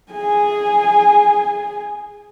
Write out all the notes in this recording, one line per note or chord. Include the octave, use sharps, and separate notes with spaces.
G#4 G#5